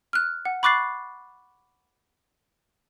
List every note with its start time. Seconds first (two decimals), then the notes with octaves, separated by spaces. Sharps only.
0.13 F6 F#6
0.45 F#5
0.63 B5 C#6 D6 F#6 A6 C7